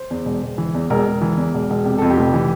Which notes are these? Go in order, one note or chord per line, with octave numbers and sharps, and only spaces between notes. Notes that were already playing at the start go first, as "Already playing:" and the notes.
Already playing: C5
E2
E1
E1
E3
E2
E1 A#4
E1
E3
E2
E1
E1
C3 G4
F2 A4
G4
F1
E3